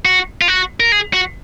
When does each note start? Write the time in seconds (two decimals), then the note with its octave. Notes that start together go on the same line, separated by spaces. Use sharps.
0.05 F#4
0.41 F4
0.48 F#4
0.80 A#4
0.92 G#4
1.14 F#4